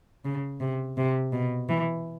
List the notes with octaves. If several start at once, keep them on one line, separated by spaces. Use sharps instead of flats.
C#3
C3
C3
B2
E3